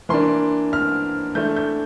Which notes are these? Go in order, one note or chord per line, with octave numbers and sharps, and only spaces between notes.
E3 A#3 D4 C6
F6
E3 A3 D4 G6
G6